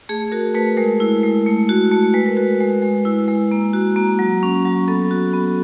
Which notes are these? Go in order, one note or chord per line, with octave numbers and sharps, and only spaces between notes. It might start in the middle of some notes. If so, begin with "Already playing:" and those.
A3 G#4
F#4 A#4
A3 B4
G#3 A#4
E4
G#3
A3
F#4
A3
G#3 B4
A#4
F#4 B4
G#3
G#3
E4
G#3
A#3
F#4
A#3
F#3
C#4
F#3
B3 A4
F#4
B3